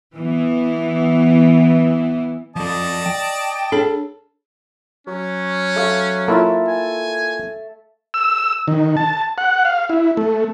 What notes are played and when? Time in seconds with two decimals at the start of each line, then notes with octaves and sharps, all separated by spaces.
0.15 E3 B3
2.56 F3 A4 D5 D#5 A5
3.06 G5
3.72 D4 G#4 A4 C#5
5.07 F#3 C#4
5.76 A3 F5
6.28 A#3 E4 F4 A4 E5
6.68 G#5
8.14 E6
8.68 D#3
8.97 A5
9.38 F#5
9.65 F5
9.89 E4
10.17 A3